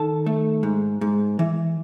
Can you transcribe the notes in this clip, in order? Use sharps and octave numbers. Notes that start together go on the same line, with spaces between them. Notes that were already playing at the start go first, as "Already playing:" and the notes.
Already playing: D#3 A4 A5
A3
G#2
G#2
E3